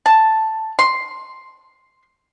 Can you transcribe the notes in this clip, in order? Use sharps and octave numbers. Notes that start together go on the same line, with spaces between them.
A5
C6